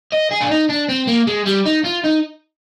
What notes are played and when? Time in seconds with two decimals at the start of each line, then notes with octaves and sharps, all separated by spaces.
0.13 D#5
0.31 G#4
0.41 D4
0.51 D#4
0.69 D4
0.89 C4
1.07 A#3
1.27 G#3
1.46 G3
1.65 D#4
1.84 F4
2.04 D#4